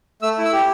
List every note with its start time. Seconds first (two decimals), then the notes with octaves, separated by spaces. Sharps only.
0.22 A3 E6
0.38 E4
0.45 E6
0.53 G4